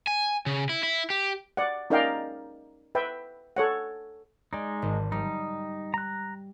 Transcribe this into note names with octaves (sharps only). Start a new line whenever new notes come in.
G#5
C#3
E4
E4
G4
D5 F#5
C#4 D#4 A#4 D5 F5 G5
B4 E5 G5
A4 C#5 F#5
G#3 D#4 D5
G#1
G3 D#4
A#5 F#6